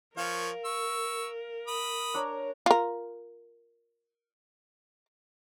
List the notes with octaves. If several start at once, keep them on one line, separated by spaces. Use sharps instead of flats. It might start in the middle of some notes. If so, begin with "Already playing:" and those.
F3 A#4 C#5 F5
C#6 E6
B5 D#6
D4 C#5 A#5
F4 A#4